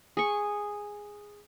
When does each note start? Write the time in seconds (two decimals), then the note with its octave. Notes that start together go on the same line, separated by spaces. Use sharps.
0.17 G#4 C#6